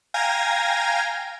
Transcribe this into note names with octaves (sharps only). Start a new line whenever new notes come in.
F5 G5 G#5 A#5 G#6 A#6